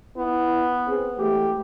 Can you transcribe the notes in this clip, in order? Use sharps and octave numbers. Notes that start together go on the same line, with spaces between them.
B3 E4
C4 G#4
E3 G#3 A3 G4